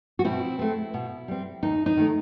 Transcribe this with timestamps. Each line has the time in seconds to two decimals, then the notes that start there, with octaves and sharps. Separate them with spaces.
0.19 F#4
0.24 B2 C4 E4
0.59 A3 C4
0.94 B2
1.28 G3 C4
1.63 D#2 D#4
1.86 D#4
1.97 D#3 A3